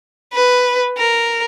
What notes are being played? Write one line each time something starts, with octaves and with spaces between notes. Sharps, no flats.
B4
A#4